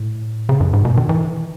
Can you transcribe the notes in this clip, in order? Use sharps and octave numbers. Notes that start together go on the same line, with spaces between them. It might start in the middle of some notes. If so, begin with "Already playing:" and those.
Already playing: A2
C#3
F#2
G#2
B2
D#3
E3